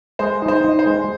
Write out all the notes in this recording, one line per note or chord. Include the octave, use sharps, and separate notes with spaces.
G#3 C5
D#4
C5
D#4
C5
G#3